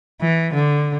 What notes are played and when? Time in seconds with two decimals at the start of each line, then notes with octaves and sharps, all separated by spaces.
0.21 E3
0.54 D3